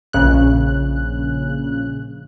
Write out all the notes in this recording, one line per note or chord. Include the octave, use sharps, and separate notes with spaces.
A#1 C#3 F#6